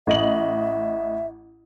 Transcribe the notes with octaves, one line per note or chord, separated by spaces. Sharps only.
A1 D#5 E5 F#7